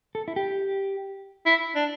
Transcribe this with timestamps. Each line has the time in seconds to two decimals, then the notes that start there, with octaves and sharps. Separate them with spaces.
0.15 A4
0.28 E4
0.36 G4
1.46 E4
1.75 D4